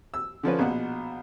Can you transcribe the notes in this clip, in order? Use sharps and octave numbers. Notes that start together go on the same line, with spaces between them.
E6
D3 F3 C#4 B4
A#1 B2 F#5